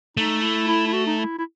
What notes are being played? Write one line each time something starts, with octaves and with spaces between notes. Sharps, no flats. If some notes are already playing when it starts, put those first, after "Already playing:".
A3 D#4
E4
E4
E4
F#4
D#4
E4
E4